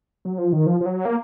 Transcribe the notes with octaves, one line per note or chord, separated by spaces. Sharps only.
F#3
F3
D#3
F3
F3
F#3
A#3